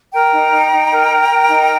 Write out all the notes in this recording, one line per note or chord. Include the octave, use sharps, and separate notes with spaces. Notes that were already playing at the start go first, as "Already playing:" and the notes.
A#4 G5 A#5
D#4
D#4
D#4
A#4
A#4
A#4
D#4